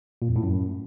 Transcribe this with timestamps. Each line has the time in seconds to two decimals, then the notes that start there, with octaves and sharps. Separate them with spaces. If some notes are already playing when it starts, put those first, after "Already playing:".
0.22 A#2
0.29 F2
0.36 A2
0.43 F#2